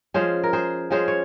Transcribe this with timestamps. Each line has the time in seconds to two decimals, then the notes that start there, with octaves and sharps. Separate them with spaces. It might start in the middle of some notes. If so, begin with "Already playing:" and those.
0.14 F3 G#3 C#4 G#4 C5
0.43 A#4
0.53 G#4 C5
0.91 F3 G#3 C#4 G#4 C5
1.08 C#5